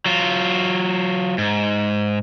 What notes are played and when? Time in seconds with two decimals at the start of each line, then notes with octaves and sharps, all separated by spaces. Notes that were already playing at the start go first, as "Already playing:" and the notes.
0.06 F#3 F4
1.38 G#2